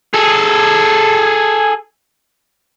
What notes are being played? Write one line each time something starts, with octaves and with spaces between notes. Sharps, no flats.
G#4 A4